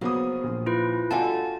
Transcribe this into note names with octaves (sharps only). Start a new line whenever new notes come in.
C#3 F3 F#3 A#3 B3 D#6
A#1
E4 F4 B4
D3 G3 A3 F4 F#4 G#5 A5